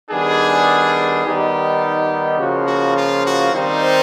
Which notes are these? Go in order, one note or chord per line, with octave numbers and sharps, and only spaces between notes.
D#3 G3 B3 D4 G#4
D#3 G3 B3 D#4 G4
C#3 F3 A#3 F#4
F#4
F4
F#4
D#3 G3 C4 D#4 C5